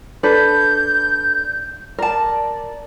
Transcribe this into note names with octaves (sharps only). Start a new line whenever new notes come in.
D4 A4 B4 G6
A#4 D5 A5